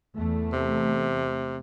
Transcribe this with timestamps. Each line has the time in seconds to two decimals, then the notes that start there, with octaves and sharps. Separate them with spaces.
0.15 E2 A3
0.53 C3